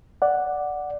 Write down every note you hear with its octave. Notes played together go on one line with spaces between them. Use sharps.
D5 F#5